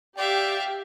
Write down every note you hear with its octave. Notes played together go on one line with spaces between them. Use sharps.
G4 D5 E5 F5 G5